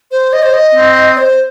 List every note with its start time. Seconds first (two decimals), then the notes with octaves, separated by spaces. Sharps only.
0.11 C5
0.33 D#5
0.43 C5
0.53 D#5
0.75 C4
1.18 C5